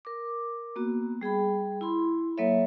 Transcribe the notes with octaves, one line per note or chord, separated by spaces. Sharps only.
A#4 D6
A#3 B3 F#4
G3 G#4 G5 B5
E4 B5 C6
F#3 A#3 A4 C#5 E5